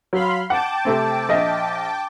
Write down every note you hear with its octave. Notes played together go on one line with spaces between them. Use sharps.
F#3 F5 B5 C6
F#5 G5 A5 D6
C3 A3 C4
A#1 D#5 E5